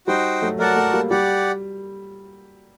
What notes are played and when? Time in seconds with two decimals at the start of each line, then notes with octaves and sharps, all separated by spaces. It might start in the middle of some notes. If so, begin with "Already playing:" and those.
0.07 G3 D#4 F#4 C5 G5
0.42 F#3 A3
0.59 F#3 A3 F#4 A#4 D5 F#5 A5
0.76 F#3 A3
0.93 G3 A#3
1.10 G3 G4 D5 F#5